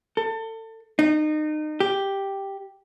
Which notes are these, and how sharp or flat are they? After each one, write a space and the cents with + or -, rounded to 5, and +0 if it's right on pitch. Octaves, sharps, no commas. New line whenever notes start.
A4 +30
D#4 -30
G4 +0